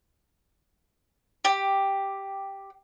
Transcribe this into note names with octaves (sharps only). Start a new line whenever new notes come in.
G4